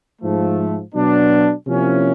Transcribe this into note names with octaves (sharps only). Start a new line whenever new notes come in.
G#2 F3 A3
B2 F#3 B3 D4
C3 F3 A#3 C#4 E4